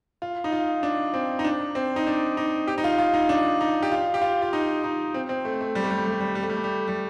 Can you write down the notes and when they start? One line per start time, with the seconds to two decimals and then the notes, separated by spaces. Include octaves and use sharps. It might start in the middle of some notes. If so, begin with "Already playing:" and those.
0.22 F4
0.44 D#4
0.52 F4
0.83 D4
1.14 C4
1.39 D#4
1.45 D4
1.75 C4
1.96 D#4
2.07 D4
2.37 D#4
2.68 G4
2.78 D#4
2.84 F4
2.98 F4
3.14 D#4
3.29 D4
3.61 D#4
3.83 G4
3.92 F4
4.14 G4
4.22 F4
4.42 F4
4.53 D#4
4.84 D#4
5.14 C4
5.29 C4
5.45 A3
5.61 A3
5.75 G3
5.84 A3
5.91 G3
5.98 A3
6.06 G3
6.13 A3
6.21 G3
6.28 A3
6.35 G3
6.43 A3
6.50 G3
6.57 A3
6.64 G3
6.88 G3